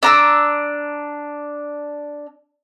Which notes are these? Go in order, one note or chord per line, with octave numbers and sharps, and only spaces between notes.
D4 A#5 E6